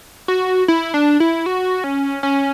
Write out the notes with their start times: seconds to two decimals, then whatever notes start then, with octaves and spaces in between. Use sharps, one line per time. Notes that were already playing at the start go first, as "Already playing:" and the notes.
0.28 F#4
0.68 E4
0.94 D4
1.20 E4
1.46 F#4
1.84 C#4
2.23 C#4